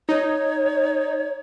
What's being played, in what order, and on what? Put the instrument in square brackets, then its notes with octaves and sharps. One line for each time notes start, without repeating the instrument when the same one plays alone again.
[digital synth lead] D#4 [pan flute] C#5